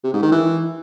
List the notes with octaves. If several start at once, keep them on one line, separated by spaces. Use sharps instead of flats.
C3
G#2
D#3
E3